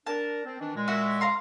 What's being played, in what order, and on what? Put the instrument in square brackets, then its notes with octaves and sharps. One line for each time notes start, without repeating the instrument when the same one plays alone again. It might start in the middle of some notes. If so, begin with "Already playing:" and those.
[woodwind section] D4 A#4 [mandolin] A5
[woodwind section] C4
D#3 E3 D4
A#2 G#3
[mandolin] F#4 A#4 E5
F5 A#5 C6